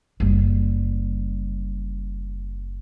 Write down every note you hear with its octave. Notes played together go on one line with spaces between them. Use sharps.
F#1 G3